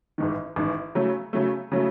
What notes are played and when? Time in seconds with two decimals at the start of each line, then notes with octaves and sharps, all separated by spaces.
0.18 A1 G#2 D#3
0.56 A1 G#2 D#3
0.95 C#3 F#3 A3
1.33 C#3 F#3 A3
1.72 C#3 F#3 A3